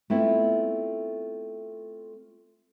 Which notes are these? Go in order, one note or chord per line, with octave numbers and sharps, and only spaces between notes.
A3 B3 C4 E4 F4 A4